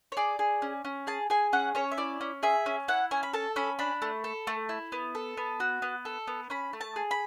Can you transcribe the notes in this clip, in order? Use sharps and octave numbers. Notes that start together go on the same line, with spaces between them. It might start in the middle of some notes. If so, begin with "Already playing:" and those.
C#5
G#4 D5
G#4
C#4
C#4
G#4 A5
G#4 G#5
C#4 F#5
C#4 C#5
E5
E4 D5
C#4
G#4 E5
C#4
E4 F#5
C#4 G#5
B5
A4 A5
C#4 B5
D4 B5
A3
A4
A3
E4
B3
A4
B3
F#4
B3
A4
B3
C#4 B5
A3
A5
G#4
B5